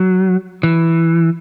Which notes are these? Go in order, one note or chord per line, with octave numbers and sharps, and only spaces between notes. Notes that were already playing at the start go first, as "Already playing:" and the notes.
Already playing: F#3
E3